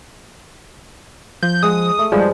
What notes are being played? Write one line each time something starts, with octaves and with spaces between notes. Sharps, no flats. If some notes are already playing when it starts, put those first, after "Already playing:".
F3 G6
G#3 F#5 D#6
A3
G2 F3 G3 G#3 D4